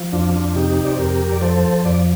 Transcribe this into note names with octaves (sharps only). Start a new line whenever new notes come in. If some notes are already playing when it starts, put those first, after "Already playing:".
Already playing: F3
F2 D4 F4
D4 F4
C3 D#4 G4
D5
C5
F2 G4 A#4
D5
F3 A4 C5
F2 D5